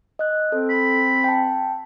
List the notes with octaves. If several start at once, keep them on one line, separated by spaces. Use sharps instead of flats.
D#5 F#6
C4 A4
B5
G5 A5